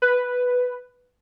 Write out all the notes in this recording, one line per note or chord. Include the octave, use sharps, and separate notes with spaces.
B4